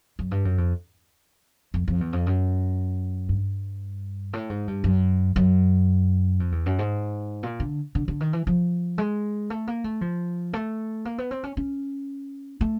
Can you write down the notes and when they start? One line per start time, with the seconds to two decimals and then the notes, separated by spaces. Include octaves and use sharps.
0.19 F#2
0.31 G2
0.45 F#2
0.58 F2
1.74 F2
1.88 F2
2.01 E2
2.13 F2
2.26 F#2
3.29 G2
4.33 A2
4.50 G#2
4.68 G2
4.84 F#2
5.36 F#2
6.40 F2
6.52 E2
6.66 F#2
6.79 G#2
7.43 A#2
7.60 D3
7.95 D3
8.08 D3
8.20 D#3
8.33 E3
8.47 F3
8.98 G#3
9.50 A3
9.67 A#3
9.84 A3
10.01 F3
10.53 A3
11.05 A#3
11.18 B3
11.31 C4
11.44 C#4
11.57 C#4
12.61 A3